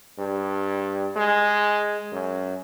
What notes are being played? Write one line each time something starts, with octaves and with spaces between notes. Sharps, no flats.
G2
G#3
F#2